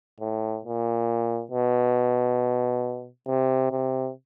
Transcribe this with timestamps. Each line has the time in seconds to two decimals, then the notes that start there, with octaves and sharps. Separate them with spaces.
0.20 A2
0.65 A#2
1.51 B2
3.28 C3
3.71 C3